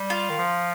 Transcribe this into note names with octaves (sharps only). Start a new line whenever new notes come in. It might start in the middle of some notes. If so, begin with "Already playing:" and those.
Already playing: G3
F4
D#3
F3